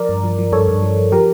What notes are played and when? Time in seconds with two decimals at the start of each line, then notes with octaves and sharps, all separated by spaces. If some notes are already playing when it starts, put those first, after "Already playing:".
Already playing: F3 A#4 D5
0.09 G2
0.24 F3
0.38 F3
0.52 G2 A4 C#5
0.68 G2
0.82 F3
0.97 F3
1.12 F3 G4 A#4